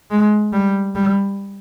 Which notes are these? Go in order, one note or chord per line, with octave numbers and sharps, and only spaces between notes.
G#3
G3
G3